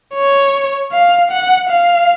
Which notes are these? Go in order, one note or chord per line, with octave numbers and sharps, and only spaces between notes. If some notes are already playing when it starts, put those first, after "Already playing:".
C#5
F5
F#5
F5